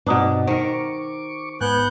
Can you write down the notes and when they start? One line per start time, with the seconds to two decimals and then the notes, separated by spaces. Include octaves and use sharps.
0.07 G2 B2 C4 D4 D#4 B4 A#5 D#6
0.47 D#3 A#4 C5 C#6 D6
1.61 G#2 B3 G#5 F#6 G6